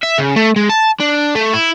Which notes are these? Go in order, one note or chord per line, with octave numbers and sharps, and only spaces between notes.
E5
C#3
A3
G#3
A5
D4
A3
E4